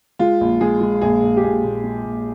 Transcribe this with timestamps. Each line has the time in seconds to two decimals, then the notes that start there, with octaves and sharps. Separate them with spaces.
0.19 G#3 F4
0.41 A#1
0.61 G#3 G#4
0.81 G#3
1.01 A#1 G#4
1.23 A#1
1.37 G4
1.43 A#1 G#4
1.64 A#2
1.84 G#3
2.04 A#2